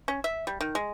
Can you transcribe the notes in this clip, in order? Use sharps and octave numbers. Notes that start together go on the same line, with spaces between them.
C#4
E5
G3
D#3
G#3